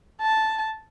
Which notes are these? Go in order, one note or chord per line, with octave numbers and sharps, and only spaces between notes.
A5